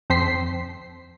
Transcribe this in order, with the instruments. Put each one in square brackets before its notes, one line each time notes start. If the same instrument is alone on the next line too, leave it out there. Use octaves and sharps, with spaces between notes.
[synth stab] F2 C4 C6 B6 C7